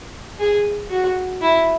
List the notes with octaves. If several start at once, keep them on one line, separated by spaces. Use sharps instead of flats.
G#4
F#4
E4